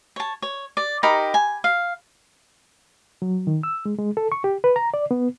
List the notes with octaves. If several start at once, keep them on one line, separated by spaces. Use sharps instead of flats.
C#5 A5
C#5
D5
D#4 G4 A#4 B5
G#5
F5
F#3
D#3
E6
G#3
G#3
A4
C#6
G4
B4
A#5
D5
B3